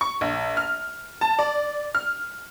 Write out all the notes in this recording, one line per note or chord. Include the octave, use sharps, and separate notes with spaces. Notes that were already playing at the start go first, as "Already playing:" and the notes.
C#6
A#1
F6
A5
D5
F6